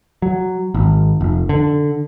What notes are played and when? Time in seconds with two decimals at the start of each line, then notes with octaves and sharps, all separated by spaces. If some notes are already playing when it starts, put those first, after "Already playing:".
0.22 F#3
0.74 G#1
1.21 F1
1.49 D3